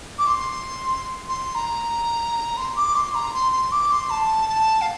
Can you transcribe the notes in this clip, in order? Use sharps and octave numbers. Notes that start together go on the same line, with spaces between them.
D6
C6
C6
A#5
C6
D6
C6
A#5
C6
C6
D6
C6
A5
A5
F5